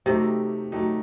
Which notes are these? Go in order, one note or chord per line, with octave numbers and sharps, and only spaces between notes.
C3 F#3 A3 D#4 G4
F#3 A3 D#4 G4